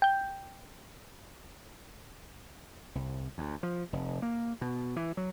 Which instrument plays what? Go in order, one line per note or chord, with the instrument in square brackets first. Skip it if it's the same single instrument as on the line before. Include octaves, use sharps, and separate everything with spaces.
[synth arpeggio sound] G5 G6
[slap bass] C2
D2
F3
F1
A#3
B2
E3
F#3